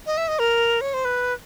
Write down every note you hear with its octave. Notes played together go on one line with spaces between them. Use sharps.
D#5
E5
D#5
A#4
C#5
C5
B4